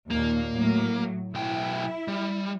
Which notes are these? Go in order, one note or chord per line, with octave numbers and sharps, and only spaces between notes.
D#2 A#2 A#3
A2 F#3
B1 E4 G5
G3